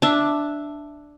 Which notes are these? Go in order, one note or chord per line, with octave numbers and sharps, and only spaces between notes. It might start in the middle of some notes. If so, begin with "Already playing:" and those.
D4 E5